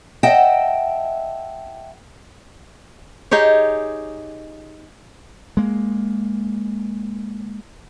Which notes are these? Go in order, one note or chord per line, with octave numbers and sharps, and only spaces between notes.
D#5 E5 F#5 G5 A5
D#4 G4 G#4 C#5
G#3 A#3